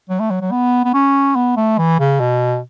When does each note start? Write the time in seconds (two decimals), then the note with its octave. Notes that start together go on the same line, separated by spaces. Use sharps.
0.09 F#3
0.20 A3
0.30 F#3
0.41 F#3
0.52 B3
0.84 B3
0.94 C#4
1.36 B3
1.57 A3
1.78 E3
1.99 C#3
2.20 B2